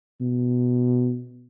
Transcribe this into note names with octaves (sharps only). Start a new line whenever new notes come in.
B2